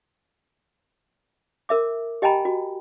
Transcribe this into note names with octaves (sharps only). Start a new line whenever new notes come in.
A#4 E5 D6
G4 D#5 G5 G#5 A#5 B5
F#4